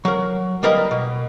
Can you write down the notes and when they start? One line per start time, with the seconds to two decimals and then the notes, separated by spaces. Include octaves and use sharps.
0.05 F#3 A#4
0.63 G3 A#3 A#4 B4 D#5
0.91 B2